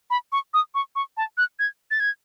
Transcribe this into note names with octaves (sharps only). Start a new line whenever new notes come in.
B5
C#6
D#6
C#6
C#6
A5
F#6
G#6
A6
G#6